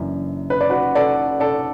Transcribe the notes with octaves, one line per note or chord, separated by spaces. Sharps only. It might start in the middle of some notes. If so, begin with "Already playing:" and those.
Already playing: F#1 F#2 E3 D4
B4
D5
F#4 B4
A4 D5
A4 D5